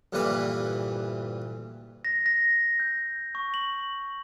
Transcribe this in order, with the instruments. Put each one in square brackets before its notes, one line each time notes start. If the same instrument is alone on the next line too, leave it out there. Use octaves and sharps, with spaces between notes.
[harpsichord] D2 G2 A#2 E3 B4 D6
[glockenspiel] A#6
A#6
G6
C#6
F#7